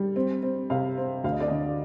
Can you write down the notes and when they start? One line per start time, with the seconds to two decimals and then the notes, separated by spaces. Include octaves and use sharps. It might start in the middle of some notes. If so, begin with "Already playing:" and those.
Already playing: G3
0.16 C4
0.43 C4
0.70 C3 F5
0.98 C4
1.24 D2 F5
1.32 D#5
1.40 D5
1.48 D3 D#5